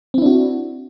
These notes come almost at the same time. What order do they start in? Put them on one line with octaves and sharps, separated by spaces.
C4 E4 D4 F#4